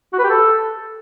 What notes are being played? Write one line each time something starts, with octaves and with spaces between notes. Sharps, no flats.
F#4
B4
G4
A4